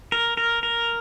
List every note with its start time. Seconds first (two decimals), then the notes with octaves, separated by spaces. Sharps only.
0.12 A#4
0.37 A#4
0.63 A#4